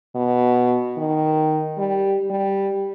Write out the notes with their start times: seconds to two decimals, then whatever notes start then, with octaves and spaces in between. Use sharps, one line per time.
0.16 B2
0.98 D#3
1.77 G3
2.30 G3